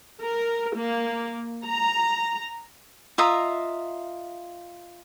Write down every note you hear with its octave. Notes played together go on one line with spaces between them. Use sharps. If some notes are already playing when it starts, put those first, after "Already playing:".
A#4
A#3
A#5
F4 D#5 E5 A#5